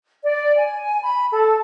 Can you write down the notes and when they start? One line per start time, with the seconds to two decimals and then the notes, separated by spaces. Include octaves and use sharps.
0.22 D5
0.57 G#5
1.03 B5
1.32 A4